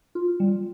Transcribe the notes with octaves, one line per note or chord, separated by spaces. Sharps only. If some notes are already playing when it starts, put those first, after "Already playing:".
F4
G3